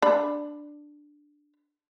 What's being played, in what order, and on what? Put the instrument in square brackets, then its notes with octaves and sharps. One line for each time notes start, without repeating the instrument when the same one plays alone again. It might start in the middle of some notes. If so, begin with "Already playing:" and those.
[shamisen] D4 B5